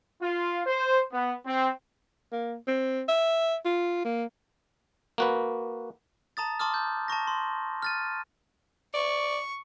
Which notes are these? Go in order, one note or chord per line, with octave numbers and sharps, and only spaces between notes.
F4
C5
B3
C4
A#3
C4
E5
F4
A#3
A#3 F#4 B4
A5 A#5 D#6 A6
A5 C6 D6 D#6 F6
G6
A5 A#5 C#6 A#6
C6
F6 A6 D#7
D5 C#6